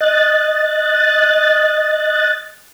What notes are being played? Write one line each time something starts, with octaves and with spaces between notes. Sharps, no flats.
D#5 F#6 A6